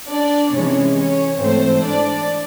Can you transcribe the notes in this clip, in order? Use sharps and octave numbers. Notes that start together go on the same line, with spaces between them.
D4 D5
C3 E3 G#3 C#4 C#5
C#4 C#5
G#2 E3 A3 C4 C5
D4 D5